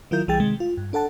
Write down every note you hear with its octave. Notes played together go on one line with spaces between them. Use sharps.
D#3 F#3 E4 F4 A#4 G6
B1 E3 G3 G#4 G5 A6
C3 D#3 G#3
F4
G2
D4 A4 F#5 A5